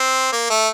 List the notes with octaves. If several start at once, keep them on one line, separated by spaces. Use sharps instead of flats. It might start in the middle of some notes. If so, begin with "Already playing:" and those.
Already playing: C4
A#3
A3